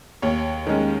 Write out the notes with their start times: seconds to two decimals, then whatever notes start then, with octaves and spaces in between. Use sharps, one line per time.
0.22 D#2 C#5
0.67 D#3 G#3 C#4